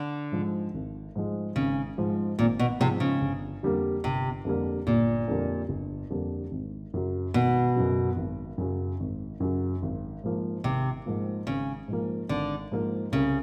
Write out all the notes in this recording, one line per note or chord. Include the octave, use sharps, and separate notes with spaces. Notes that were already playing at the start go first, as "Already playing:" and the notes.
Already playing: D3
G#2 F3 G#3
G#1
G#2 F3 G#3
G#1 C#3
G#2 F3 G#3
G#1 A#2
B2
G#2 C3 F3 G#3
C#3
G1
F2 D3 G3 A#3
G1 C3
F2 D3 G3 A#3
G1 A#2
F2 D3 G3 A#3
G1
F2 D3 G3 A#3
G#1
F#2 C#3 F#3
G#1 B2
F#2 C#3 F#3
G#1
F#2 C#3 F#3
G#1
F#2 C#3 F#3
G#1
G#2 F3 A#3
G#1 C3
G#2 F3 A#3
G#1 C#3
G#2 F3 A#3
G#1 D3
G#2 F3 A#3
C2 C#3